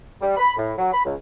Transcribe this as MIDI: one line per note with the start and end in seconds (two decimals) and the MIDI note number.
0.21 0.35 55
0.37 0.55 83
0.57 0.73 45
0.78 0.92 54
0.93 1.03 83
1.05 1.14 37